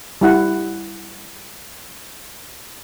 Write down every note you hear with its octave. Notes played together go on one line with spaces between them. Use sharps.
G3 E4 F#5